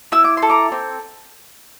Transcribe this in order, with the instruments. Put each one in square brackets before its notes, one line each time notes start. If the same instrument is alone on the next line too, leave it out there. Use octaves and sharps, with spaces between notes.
[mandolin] E4 E6
D6
C6
A4
A#5 D6
C4